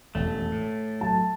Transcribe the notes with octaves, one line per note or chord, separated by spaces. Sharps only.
E1 A1 F2 A3
A2
F#3 A5